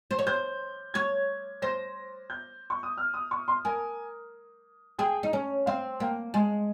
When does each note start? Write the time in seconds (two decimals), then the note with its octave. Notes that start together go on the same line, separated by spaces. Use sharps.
0.11 C5
0.19 C#5
0.27 C5 G6
0.94 C#5 G#6
1.62 C5 A#6
2.30 G6
2.70 C#6
2.83 D#6
2.97 F6
3.14 D#6
3.31 C#6
3.48 C6
3.65 A#4 G#5
4.99 G#4 G5
5.23 D#4
5.33 C#4
5.66 C4 F5
6.00 A#3 G5
6.34 G#3 G#5